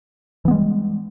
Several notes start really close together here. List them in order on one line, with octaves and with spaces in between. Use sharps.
E3 B3 G#3 G3